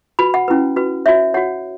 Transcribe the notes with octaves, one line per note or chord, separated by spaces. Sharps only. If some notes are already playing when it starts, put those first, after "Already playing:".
F#4 B4 B5
F#5
C#4 E4 B4
F#4 B4
F#4 C#5 E5
F#4 C#5 F#5